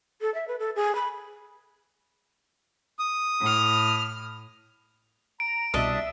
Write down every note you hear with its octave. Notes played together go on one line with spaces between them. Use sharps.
A4
E5
B4
A4
G#4
B5
D#6
A2 F6
A#5 D7
C2 B2 D4 D#5 E5